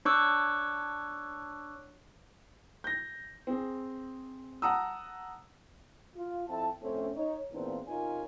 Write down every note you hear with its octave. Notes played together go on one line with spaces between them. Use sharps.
D4 C#5 C#6 D6 E6 F#6
G6 A#6
C4 G#4
F#5 A5 A#5 D#6 E6
F4
F2 C4 E4 A5
F2 A2 A3 C4 C#4
D#4 C#5
E2 A#2 C#3 C4 D4 A#4
C3 C#4 D#4 F4 A#4 G#5